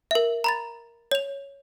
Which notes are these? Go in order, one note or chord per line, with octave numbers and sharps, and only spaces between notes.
A#4 E5
A#5 B5 A6
C#5 F7